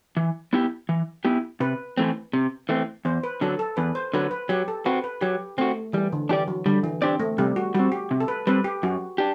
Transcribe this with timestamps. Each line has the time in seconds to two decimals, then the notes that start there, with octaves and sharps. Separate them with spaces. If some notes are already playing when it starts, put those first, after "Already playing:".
0.17 E3
0.53 B3 E4 G4
0.89 E3
1.25 B3 E4 G4
1.60 C3 B4
1.97 E3 A3 C4
2.33 C3
2.69 E3 A3 C4
3.05 E2 C5
3.23 B4
3.41 D3 F#3 A4
3.59 A4
3.77 E2 B4
3.95 C5
4.13 D3 F#3 B4
4.31 B4
4.49 F#3 G4
4.68 A4
4.85 C4 F#4 B4
5.04 B4
5.21 F#3 G4
5.58 A3 C4 F#4
5.93 E3 G3
6.13 D3
6.29 E3 D4 G4 D5
6.48 F#3
6.66 D3 G3
6.84 E3
7.02 C4 D4 G4 D5
7.20 A3
7.38 C3 G3
7.56 F#4
7.74 G3 F#4
7.79 C4
7.92 G4
8.11 C3
8.20 A4
8.28 B4
8.47 G3 C4 B4
8.64 G4
8.83 F#2 F#4
9.18 D4 G4